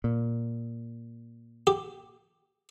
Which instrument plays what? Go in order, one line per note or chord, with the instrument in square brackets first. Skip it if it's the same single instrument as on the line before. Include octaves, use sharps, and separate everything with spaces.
[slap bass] A#2
[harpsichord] G4